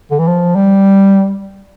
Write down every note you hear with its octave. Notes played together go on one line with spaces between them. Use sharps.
D3
E3
F3
G3